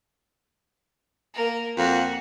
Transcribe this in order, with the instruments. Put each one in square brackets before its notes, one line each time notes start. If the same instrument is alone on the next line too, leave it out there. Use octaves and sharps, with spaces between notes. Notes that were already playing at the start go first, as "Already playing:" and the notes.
[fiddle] A#3 A#4
[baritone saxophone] F2 [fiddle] A#3 F#4